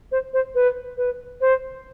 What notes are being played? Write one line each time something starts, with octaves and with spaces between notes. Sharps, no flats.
C5
C5
B4
B4
C5